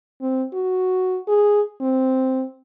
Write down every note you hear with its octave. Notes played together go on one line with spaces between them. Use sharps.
C4
F#4
G#4
C4